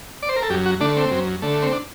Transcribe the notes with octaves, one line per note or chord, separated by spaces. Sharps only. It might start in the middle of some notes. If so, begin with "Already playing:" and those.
D5
C5
A#4
A4
F#2 G4
F#4
D3 A3 D4
C4
F#2
D3 A3
C4
D4